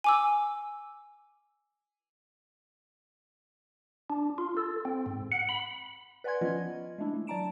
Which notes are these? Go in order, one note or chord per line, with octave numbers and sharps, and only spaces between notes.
G#5 D6 E6
D4
F4
A4
C4
G#2
F#5
B5
B4 D5 F#5 G#5 C6 G#6
F3 B3 C#4 F4 D#5
G#3 A3 D4 E4
A3
F#3 D5 A5 A#5 D7 E7